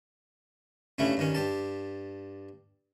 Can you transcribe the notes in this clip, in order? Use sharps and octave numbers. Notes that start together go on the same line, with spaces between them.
G2 C#3 A3 C#4 E4
G2 D#3 C#4
G2 G4 A5